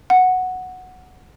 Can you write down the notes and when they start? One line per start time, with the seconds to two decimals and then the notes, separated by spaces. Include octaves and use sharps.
0.10 F#5